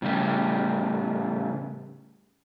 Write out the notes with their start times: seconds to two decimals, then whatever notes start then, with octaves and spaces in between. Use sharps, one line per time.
0.02 A2 C#3 G3 G4